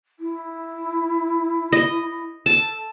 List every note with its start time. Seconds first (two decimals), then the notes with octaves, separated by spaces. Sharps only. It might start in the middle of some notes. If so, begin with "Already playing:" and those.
0.19 E4
1.72 D#5
2.46 A4 A5